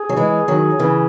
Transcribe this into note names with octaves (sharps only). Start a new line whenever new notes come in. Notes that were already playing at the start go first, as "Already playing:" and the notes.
Already playing: G#4
F#3
E3 G#3
D#3 F#3
C#3 E3